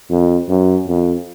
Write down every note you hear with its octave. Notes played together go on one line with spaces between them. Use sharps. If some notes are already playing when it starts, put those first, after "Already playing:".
F2
F#2
F2